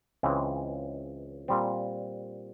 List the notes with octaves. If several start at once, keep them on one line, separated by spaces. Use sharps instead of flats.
C#2 C#3 E3 G#3 C4
A#2 G3 C4